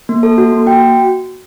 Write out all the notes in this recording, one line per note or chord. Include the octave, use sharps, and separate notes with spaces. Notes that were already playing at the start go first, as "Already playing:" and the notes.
A#3
A4
F#4
A#3
F#4 G5